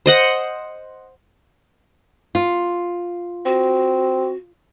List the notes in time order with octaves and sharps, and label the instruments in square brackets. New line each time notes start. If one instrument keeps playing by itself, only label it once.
[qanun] C5 D#5 F#5
[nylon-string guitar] F4
[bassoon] C4 [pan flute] F#4